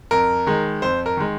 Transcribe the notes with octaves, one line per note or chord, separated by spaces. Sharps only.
F2 A#4
D#3 G#3
F2 C5
A#4
D#3 G#3